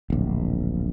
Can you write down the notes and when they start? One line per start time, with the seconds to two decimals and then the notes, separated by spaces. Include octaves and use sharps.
0.10 D1 A#1